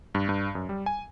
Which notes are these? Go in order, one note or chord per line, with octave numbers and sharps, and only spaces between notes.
G2
G2
F#2
G3
G#5